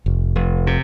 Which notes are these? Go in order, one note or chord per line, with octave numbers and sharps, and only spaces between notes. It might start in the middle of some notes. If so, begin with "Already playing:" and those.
F1
F1
C3